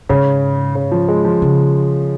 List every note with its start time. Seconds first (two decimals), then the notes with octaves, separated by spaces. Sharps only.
0.09 G#2 C#3
0.75 C#3
0.91 F3
1.08 G#3
1.25 F3
1.42 C#3